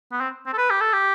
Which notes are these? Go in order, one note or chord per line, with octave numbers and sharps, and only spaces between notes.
B3
C4
C4
A4
B4
G4
A4
G4